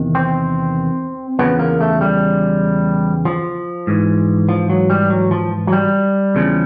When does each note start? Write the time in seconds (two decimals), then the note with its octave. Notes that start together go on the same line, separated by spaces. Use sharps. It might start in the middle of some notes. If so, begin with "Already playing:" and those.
Already playing: E2 C3 D#3
0.15 C4
1.39 E2 C#3 F3 B3
1.59 A#3
1.81 A3
2.01 G3
3.25 F3
3.87 G#2 E3
4.49 F3
4.70 F#3
4.90 G3
5.10 F#3
5.31 F3
5.67 F#3
5.72 G3
6.35 E2 C#3 F3